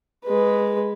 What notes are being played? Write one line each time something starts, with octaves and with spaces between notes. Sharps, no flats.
G#3 B4